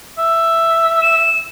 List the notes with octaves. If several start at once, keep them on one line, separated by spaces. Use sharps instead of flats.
E5
E7